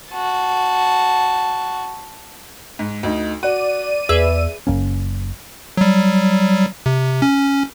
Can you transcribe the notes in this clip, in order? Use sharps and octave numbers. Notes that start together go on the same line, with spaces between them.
F#4 A5
G#2
D2 D#4
F#4 D5 D#7
E2 G#4 B4 E5 E6
F#1 F#2 A#3 C#4
F#3 G3
C3
C#4